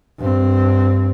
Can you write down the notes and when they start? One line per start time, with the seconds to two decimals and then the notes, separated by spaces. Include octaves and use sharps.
0.19 G2 C4